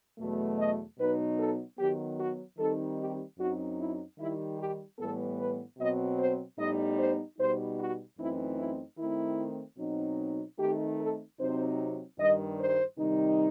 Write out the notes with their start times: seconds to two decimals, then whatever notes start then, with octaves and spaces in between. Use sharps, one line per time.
0.18 E2 B2 F#3 A3
0.58 D#5
0.98 B2 F#3 B3 D#4 B4
1.38 A4
1.78 D#3 F#3 B3 G4
2.19 F#4
2.58 D#3 G3 C4 D#4 A4
2.98 G4
3.38 F#2 F#3 C4 D#4 F#4
3.79 E4
4.18 D#3 G3 D#4 E4
4.58 G4
4.98 A2 E3 G3 B3 A4
5.38 B4
5.78 B2 F#3 C4 D#5
6.18 C5
6.58 A2 G3 B3 D#4 D#5
6.98 C5
7.38 B2 G3 D#4 C5
7.79 F#4
8.18 F#2 E3 A3 C4 D#4 E4
8.58 E4
8.98 D#3 A3 C4 E4
9.78 B2 F#3 C4 D#4
10.58 D#3 A3 C4 D#4 G4
10.98 A4
11.38 C3 F#3 C4 D#4 C5
12.19 G2 D#3 G3 D#5
12.58 C5
12.98 C3 D#3 G3 D#4